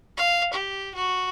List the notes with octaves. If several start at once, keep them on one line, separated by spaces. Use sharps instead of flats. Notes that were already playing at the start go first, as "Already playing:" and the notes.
F5
G4
F#4